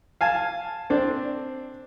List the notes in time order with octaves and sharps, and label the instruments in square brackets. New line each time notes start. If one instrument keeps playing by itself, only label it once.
[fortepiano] F5 G#5 A5
C4 D4